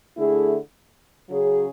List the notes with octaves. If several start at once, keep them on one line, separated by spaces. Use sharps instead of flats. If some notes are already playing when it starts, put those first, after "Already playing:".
D3 A3 E4 G#4
C#3 F#3 C#4 G#4